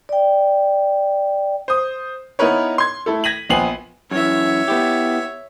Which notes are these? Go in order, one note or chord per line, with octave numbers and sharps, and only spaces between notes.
D5 G5
C5 D#6
B3 D#4 E4 A#4 B4 C#5
C6 G#6
A3 E4 A4
G#6 A#6 B6 D#7 F#7
A#1 B3 G5 G#5 C7 F#7
F#2 E3 C#5 E5
B3 E4 G4